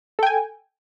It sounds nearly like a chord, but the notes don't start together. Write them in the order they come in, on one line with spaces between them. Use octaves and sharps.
A4 G5 G#5